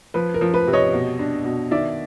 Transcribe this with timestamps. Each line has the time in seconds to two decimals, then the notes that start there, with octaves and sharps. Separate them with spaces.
0.14 F3 B4
0.34 A#4
0.41 F3
0.54 B4
0.67 C3
0.73 C#5 D#5
0.93 B2
1.19 D4
1.45 B2
1.71 D#3 D5 E5